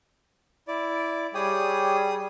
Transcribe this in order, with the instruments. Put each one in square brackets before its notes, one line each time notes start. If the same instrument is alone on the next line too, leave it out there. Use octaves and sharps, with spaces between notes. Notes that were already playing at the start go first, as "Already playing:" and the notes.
[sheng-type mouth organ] E4 D5
[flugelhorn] G3 [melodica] G4 C#5 G5 [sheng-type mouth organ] G#4 D#6